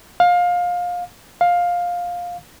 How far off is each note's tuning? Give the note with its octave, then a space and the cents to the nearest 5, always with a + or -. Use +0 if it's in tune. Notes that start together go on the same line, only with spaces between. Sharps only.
F5 +25
F5 +15